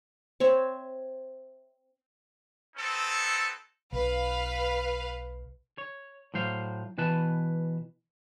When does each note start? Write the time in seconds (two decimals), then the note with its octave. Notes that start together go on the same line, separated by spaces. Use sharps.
0.40 C4 C#5 E5
2.76 B3 C4 D#4 A4
3.92 B1 B4 F5
5.78 C#5
6.34 A2 F#3 C5 F5
6.98 B2 E3 B4 A5